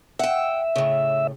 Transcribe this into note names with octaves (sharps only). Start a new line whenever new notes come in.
E5 F#5 G5
A2 C#3